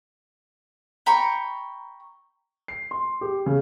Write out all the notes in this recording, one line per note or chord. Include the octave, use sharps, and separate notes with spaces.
G5 A#5 B5 C#6
C7
C6
G4
C#3